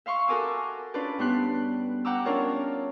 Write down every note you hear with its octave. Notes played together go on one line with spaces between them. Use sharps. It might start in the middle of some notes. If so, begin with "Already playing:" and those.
E5 F5 C6 C#6
F#4 A4 A#4 G#5 D6 E6
C#4 D4 F4 B4 D5
G2 B3 D4 C6 F#6
F#5 G5 A#5 D6 E6
C#4 D4 F4 A#4 C#5 D5